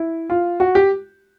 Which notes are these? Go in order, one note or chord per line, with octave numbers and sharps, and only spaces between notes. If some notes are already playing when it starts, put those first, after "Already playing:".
Already playing: E4
F4
F#4
G4